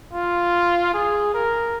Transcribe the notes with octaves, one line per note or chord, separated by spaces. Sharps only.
F4
G#4
A#4